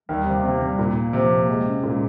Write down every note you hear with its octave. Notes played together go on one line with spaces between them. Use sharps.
D#2 D#3 G3
C3 A#3
C3 A#3
C3 G3
A#2 A#3
A#3
C3 F3
A#3
G#3
C#4
A#2 G#3